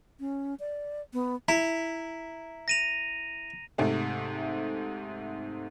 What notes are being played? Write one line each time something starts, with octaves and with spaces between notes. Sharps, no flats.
C#4
D5
B3
E4 A#5
A#6 D#7 F7
G#2 C3 A3